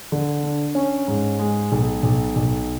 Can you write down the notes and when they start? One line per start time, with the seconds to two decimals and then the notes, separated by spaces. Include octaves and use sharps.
0.12 D3
0.43 D4
0.75 C#4
1.08 G#2
1.40 G#3
1.72 B1
2.03 B1
2.36 B1